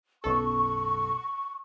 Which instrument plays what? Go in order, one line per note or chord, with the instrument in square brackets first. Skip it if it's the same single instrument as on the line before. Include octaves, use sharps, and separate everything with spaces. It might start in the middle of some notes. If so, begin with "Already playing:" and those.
[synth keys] B1 F#2 A4 [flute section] C#6